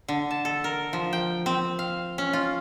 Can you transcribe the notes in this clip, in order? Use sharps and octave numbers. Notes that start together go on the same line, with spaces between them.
D3
A5
A4
A#4
F3
G5
C4
F5
C#4
F4